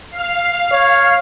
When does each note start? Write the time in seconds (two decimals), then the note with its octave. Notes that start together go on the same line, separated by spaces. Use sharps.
0.11 F5
0.72 C#5